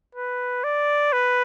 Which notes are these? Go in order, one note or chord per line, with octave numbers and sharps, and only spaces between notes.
B4
D5
B4